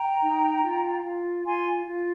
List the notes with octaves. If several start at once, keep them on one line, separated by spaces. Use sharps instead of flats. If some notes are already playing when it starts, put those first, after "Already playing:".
Already playing: G5 A#5
D#4
F4
F4
F4 G#5 C6
F4